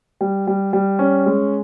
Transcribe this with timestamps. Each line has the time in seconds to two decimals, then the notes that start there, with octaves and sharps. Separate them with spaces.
0.21 G3
0.47 G3
0.73 G3
0.99 C#4
1.26 G#3